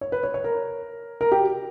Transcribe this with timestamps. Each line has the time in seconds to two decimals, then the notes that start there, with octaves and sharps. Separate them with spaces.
0.01 C#5
0.12 B4
0.23 C#5
0.34 C#5
0.44 A#4
1.21 A#4
1.32 G4